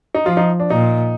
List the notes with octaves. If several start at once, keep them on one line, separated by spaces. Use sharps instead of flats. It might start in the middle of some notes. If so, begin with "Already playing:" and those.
D#4
F3 F4
D#4
D4
A#2 D#4